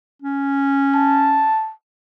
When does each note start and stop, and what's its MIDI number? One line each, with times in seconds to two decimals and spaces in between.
0.22 1.51 61
0.95 1.73 81